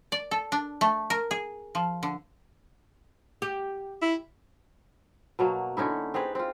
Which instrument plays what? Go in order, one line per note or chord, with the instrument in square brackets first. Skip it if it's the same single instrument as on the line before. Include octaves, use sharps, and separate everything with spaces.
[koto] D5
A4
D4
A3
A#4
G#4
F3
D3
[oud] G4
[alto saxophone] E4
[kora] B2 F#3 A#3
D3 C#4 D#4 E4
C4 G4 G#4 B4
C4 F4